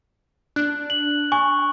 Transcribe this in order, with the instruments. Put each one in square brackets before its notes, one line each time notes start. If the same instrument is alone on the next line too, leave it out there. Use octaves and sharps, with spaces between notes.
[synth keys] D4 [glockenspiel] F#6
[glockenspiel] F#7
[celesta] G#5 [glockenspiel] C#6